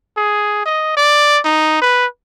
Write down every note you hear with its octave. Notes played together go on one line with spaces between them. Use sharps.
G#4
D#5
D5
D#4
B4